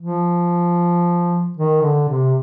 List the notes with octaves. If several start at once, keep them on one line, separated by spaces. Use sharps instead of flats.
F3
D#3
D3
C3